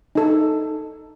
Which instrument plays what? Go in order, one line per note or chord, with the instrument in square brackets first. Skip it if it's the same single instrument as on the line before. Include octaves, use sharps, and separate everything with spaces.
[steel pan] D#4 A4